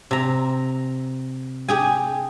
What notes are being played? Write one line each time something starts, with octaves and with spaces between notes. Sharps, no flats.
C3 A#5
G4 G#4 G#5